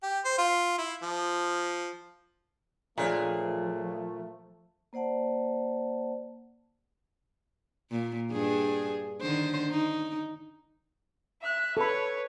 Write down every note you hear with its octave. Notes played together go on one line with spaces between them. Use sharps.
G4
C5
F4
E4
F3
A#2 F3 A3 D4 G#4 C#5
A#3 C5 D5 F#5 A5
A#2
G2 D4 G#4
D3 D#3 C5
D#4
E5 F#6
A4 B4 C#5 B5